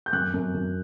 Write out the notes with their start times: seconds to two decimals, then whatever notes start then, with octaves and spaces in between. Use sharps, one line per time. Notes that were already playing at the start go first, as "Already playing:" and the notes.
0.06 G6
0.13 F#2 F#6
0.34 F#2
0.55 F#2